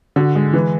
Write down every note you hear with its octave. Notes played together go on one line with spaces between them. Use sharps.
D3 F#4
G#3
E3 B4